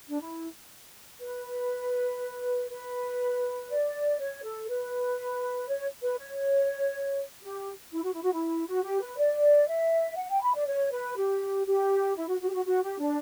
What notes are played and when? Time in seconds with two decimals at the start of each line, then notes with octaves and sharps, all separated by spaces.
0.09 D4
0.21 E4
1.20 B4
2.70 B4
3.69 D5
4.19 C#5
4.43 A4
4.68 B4
5.69 C#5
6.02 B4
6.18 C#5
7.42 G4
7.93 E4
8.03 F#4
8.13 E4
8.23 F#4
8.33 E4
8.68 F#4
8.84 G4
9.01 B4
9.17 D5
9.67 E5
10.17 F#5
10.29 G5
10.41 B5
10.54 D5
10.67 C#5
10.91 B4
11.16 G4
11.66 G4
12.16 E4
12.28 F#4
12.40 F#4
12.49 G4
12.54 F#4
12.65 F#4
12.82 G4
12.99 D4